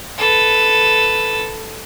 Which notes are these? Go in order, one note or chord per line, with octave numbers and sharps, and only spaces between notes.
A4 B4